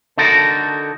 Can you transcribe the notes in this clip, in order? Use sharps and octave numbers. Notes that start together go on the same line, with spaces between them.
D3 D#4 F#4 A4 A#4